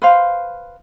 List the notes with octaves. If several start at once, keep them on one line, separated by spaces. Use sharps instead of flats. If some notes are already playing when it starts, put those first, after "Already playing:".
B4 C5 F5